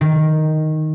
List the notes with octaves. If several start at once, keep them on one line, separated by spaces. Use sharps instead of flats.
D#3